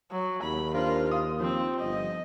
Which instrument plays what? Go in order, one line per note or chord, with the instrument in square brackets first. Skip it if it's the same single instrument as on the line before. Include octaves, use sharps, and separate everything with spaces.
[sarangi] F#3
[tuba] D#2 [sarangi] B5
[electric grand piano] D4 A#4 C5 [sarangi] F4
[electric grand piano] D#6
[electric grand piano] F3 [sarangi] C4
[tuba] G1 [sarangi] D#5